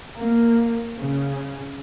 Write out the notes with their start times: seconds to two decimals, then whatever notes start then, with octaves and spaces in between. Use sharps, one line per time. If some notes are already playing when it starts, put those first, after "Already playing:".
0.16 A#3
0.98 C#3